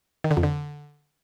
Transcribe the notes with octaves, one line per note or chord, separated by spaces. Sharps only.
D#3
D3
F2
D3